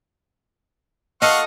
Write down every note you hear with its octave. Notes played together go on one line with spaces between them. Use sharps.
F4 A4 D#5 F5 F#5 C#6